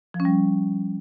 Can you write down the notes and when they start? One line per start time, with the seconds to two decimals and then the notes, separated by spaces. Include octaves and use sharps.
0.14 F3
0.20 C#4
0.25 G3